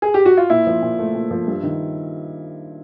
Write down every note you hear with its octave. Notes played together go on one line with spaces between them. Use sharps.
G#4
G4
F#4
F4
A#2 E4
F3
A#2
A3
A#2
F3
G2
D#3